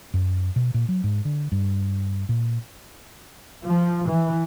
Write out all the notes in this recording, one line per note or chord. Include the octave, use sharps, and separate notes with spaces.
F#2
B2
A#2
F#3
G#2
D3
G2
A#2
F3
E3